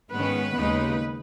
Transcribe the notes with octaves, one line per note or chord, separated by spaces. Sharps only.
G#2 D#3 G#3 B3 C#4 B4
D#2 C#3 G#3 B3 D#4